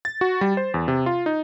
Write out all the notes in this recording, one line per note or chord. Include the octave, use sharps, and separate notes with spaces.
A6
F#4
G3
C5
E2
C3
F4
D#4